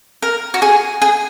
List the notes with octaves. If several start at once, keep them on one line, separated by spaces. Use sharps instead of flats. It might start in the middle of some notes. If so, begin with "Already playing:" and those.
A#4
F#4
G#4
G#4